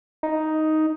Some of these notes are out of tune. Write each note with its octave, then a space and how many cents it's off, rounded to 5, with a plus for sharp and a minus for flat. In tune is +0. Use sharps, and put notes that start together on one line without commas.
D#4 +5